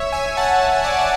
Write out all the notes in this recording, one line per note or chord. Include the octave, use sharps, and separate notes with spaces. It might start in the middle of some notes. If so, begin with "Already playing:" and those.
Already playing: C#5 E5
E5 G#5
F#5 A5
E5
D5 F#5
F#5